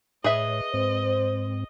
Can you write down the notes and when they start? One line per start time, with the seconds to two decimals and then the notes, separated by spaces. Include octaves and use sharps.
0.24 A2 G#4 B4 C#5 D#5 E5
0.74 G#2 C4 C5